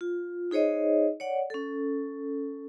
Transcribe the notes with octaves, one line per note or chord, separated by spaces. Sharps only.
F4
D#4 G#4 C5 C#5 D#5
C#5 D5 F#5
C#4 A4